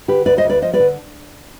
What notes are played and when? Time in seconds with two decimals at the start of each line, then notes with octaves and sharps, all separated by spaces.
0.08 D3 G4 B4
0.26 D2 B4 D5
0.38 C5 D#5
0.44 D2
0.50 B4 D5
0.62 F3 C5 D#5
0.73 B4 D5
0.80 D3